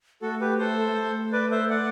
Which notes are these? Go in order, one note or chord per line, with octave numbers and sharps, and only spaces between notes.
A3 F#4 A4
G4 B4
A4 C5
A3
B4 D5
C5 E5
D5 F#5